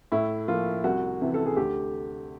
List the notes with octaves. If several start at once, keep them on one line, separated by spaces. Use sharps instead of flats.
A2 E4
F3 A#3 F4
C2 F#4
C3 E3
A4
G#4
D2 G4